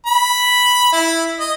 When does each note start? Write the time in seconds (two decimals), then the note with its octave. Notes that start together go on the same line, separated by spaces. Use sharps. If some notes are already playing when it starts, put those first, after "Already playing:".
0.06 B5
0.92 E4
1.40 D#5